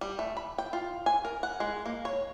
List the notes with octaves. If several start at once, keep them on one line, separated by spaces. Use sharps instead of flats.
G3
A3
B5
G5
F4
G#5
A#4
F#5
G#3
A#3
C#5